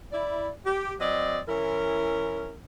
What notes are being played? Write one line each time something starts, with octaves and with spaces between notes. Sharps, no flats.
E4 D5
G4
F#3 C4 D5 D#5
E3 C#4 E4 A#4